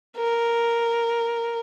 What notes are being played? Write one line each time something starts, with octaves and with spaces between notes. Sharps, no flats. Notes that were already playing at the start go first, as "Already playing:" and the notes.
A#4